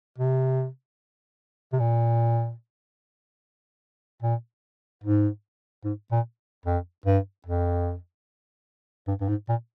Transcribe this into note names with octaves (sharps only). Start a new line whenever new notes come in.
C3
C3
A#2
A#2
G#2
G#2
A#2
F2
G2
F2
G2
G2
G#2
A#2